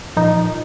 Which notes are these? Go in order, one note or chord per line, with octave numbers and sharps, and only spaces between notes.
A#2 F3 D#4